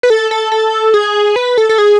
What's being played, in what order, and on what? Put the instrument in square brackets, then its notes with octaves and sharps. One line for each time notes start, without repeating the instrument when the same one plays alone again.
[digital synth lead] B4
A4
A4
A4
G#4
B4
A4
A4
G#4